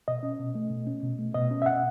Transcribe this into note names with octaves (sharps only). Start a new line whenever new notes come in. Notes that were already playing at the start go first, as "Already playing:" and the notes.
B2 D#5
C#4
B2
A3
B2
C#4
B2
A3
B2 D#5
C#4
E5
B2 F#5